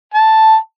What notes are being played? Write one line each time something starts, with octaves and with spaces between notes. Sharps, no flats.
A5